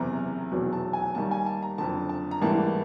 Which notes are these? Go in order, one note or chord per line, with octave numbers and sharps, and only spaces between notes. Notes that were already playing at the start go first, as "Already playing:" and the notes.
Already playing: F#1 E2 C3 A#5
F1 E2 B2 F#3
A5
G#5
D#2 D#3 G3 A5
G#5
A5
A#5
F#1 F2 D3 A5
A5
A#5
A1 G#2 E3 G3 A#3 A5